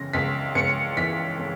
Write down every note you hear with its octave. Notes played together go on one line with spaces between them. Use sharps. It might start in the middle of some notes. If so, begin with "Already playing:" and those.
Already playing: C#2 C#3 E3 A#6
C#2 B6
C#2 C#7
E3 B6
C#3